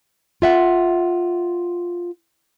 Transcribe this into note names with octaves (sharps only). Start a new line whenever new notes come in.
F4 E5 F#5